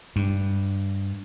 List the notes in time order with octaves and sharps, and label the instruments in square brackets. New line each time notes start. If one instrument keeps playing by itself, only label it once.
[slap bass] G2